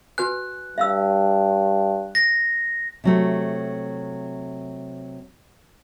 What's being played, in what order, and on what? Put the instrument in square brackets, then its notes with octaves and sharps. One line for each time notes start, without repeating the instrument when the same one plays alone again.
[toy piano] F#4 B4 G#5 [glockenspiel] F#6
[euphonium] G2 [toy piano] E5 F5 E6
[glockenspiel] A#6
[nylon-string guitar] C3 F#3 A3